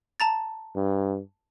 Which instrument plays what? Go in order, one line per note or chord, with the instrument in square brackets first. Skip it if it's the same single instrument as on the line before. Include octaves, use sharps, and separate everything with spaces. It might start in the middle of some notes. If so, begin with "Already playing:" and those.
[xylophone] A5 A#5 A6
[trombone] G2